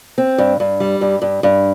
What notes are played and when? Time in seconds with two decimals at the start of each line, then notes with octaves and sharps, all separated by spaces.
0.18 C4
0.38 G2
0.60 G2
0.80 G3
1.01 G2
1.22 G2
1.43 G2